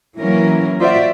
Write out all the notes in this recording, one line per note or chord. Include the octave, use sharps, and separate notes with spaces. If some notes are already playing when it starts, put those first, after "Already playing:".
E3 F#3 A#3 C#4 A#4
F4 F#4 C5 D5 E5